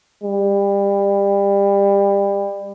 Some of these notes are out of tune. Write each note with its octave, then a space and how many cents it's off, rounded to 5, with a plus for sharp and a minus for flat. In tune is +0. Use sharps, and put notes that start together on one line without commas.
G3 +25